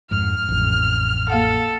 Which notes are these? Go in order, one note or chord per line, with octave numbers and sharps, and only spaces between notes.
F2 G#2 F6
A1 F2
A#3 A4 F5 F#5